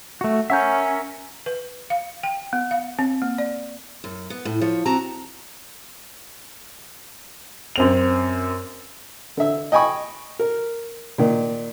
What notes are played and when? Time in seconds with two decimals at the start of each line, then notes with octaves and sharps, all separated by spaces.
0.21 A3 F#4
0.50 C#4 A#4 C#5 E5 F#5 A#5 G6
1.46 B4
1.90 F5
2.24 G5
2.53 B3
2.71 F5
2.99 C4
3.22 A#3
3.38 D5
4.04 F#2
4.30 B3
4.45 A2
4.61 F3 C#5
4.86 C4 F#4 A5 A#5
7.76 F#2 C4 F7
9.37 D3 E5
9.72 D#5 G5 G#5 B5 C#6
10.39 A#4
11.18 A#2 D#3